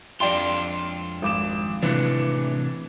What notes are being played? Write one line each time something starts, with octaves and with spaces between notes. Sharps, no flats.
F2 D4 F4 D5 G5 C6
G#1 D6 E7
A2 C3 E3 D4